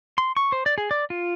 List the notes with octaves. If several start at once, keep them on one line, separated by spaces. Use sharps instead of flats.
C6
C#6
C5
D5
G#4
D5
F4